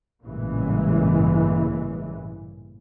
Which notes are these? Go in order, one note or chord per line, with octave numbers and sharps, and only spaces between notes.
A1 G2 A#2 C#3 E3 G#3